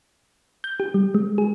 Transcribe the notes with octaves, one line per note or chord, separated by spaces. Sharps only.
G6
G4
G3
G#3
G#4